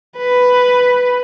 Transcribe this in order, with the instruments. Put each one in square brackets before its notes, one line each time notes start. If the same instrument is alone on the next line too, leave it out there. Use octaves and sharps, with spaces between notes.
[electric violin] B4